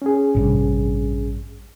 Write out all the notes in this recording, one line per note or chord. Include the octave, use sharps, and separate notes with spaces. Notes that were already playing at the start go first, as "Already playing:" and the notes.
C#4 G#4
A1 G2 C3